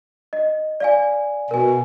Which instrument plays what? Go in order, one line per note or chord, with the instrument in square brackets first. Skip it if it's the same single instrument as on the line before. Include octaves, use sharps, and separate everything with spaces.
[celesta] D#5
D5 F5 G#5
[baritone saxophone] B2 [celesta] A#4 G#5